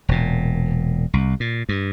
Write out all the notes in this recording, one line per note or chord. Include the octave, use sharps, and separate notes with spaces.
E1 A#2
C2
A#2
G2